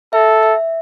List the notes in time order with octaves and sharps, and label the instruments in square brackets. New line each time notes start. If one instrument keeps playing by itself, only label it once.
[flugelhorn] A4 [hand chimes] E5
[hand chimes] E5